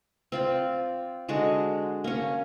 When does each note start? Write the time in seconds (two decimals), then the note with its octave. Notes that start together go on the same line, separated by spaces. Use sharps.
0.32 C4 F4 D5
1.29 D3 G#3 F#4 A5
2.04 A#3 C#4